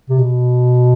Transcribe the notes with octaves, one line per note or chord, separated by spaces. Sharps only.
C3
B2